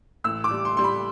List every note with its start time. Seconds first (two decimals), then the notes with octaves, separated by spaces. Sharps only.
0.24 A1 E6
0.44 D6
0.51 G3
0.65 C6
0.77 G3 C6
0.84 B5